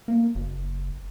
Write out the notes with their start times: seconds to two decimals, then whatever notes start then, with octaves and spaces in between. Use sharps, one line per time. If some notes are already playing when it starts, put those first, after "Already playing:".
0.08 A#3
0.35 F#1